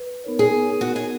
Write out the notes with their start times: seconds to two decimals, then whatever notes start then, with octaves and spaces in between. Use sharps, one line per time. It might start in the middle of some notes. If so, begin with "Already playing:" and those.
Already playing: B4
0.24 B3 D#4 A#4 C#5
0.39 G#4
0.81 F#4
0.96 G#4